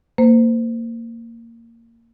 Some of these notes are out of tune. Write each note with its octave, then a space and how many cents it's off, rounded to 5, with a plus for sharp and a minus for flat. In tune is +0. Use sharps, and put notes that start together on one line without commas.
A#3 -20 C5 -25